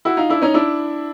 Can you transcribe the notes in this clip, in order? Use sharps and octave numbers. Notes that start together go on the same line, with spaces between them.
E4 F#4
D#4 F4
D4 E4
C#4 D#4
D4 E4